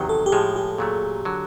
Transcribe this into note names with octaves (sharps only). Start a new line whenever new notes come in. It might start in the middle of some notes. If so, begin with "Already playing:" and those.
Already playing: E2 C3 D#3 F#3 G4
A4
G4
A2 F3 G#3 G#4
G4
A#2 F#3 A3
D3 F#3